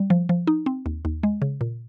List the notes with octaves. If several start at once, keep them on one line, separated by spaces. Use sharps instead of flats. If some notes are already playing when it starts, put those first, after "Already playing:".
Already playing: G3
F3
F3
D#4
C4
D#2
D#2
G#3
C#3
A#2